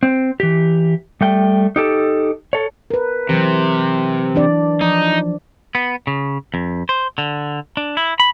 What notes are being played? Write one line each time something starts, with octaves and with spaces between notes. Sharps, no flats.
C4
E3 G4
G3 A3 G5
D#4 G4 A4
A4 C#5
A#4 B4
C3 E3 F#3
E3 D4 D5
F3 D#4
B3
C#3
F2
C5
D3
D4
E4
B5